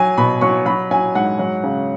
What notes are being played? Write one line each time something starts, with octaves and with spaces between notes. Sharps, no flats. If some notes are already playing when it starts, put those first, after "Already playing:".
Already playing: F#3 G#5
B2 B5
F#3 C#6
F#3 B5
F#3 G#5
G#2 F#5
F#3
C#3